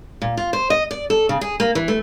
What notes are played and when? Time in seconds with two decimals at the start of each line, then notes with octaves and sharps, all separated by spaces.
0.22 A#2
0.37 F4
0.53 C5
0.70 D#5
0.91 D5
1.10 A4
1.29 C#3
1.41 G#4
1.60 A#3
1.75 E3
1.88 A3